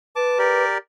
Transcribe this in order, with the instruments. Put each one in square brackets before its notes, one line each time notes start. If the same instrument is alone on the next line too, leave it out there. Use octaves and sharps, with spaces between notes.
[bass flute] B4 [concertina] A5 D6
[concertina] G4 A#4 D5